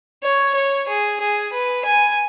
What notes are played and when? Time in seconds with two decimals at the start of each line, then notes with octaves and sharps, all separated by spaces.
0.23 C#5
0.55 C#5
0.88 G#4
1.21 G#4
1.52 B4
1.85 G#5